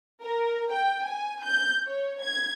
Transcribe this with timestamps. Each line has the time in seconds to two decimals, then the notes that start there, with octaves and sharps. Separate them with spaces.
0.22 A#4
0.72 G5
1.05 G#5
1.43 G6
1.87 C#5
2.21 G#6